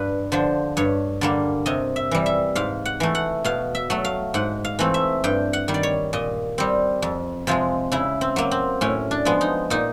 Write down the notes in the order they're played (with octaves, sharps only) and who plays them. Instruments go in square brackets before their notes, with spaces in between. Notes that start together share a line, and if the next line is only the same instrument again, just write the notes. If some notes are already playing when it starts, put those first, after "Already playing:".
Already playing: [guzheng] G2 B4
D3 F3 C5
G2 C#5
D3 G3 A#3
C3 D#5
E5
E3 G3
E5
G#2 F5
F#5
E3 A3
F#5
B2 F5
E5
F#3 A3
F5
G#2 F#5
F5
E3 A3 C4
E5
G2 G5
F#5
D#3 G3
D5
C#5
A#2 D#5
G3 C4
F2
C3 F3 G#3 F4
C#3 E4
C4
F#3 A#3
C4
A2 C#4
D4
F3 G#3 B3
D#4
A#2 D#4